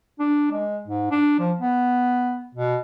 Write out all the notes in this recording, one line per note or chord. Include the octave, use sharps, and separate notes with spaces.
D4
G#3
G#2
D4
F3
B3
B2